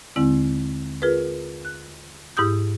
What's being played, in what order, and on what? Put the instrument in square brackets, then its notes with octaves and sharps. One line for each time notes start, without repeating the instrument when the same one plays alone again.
[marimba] D#2 D3 G#3 C4 E4
F4 G#4 A#4 B4
F#6
G#2 E4 G4 D#6 G6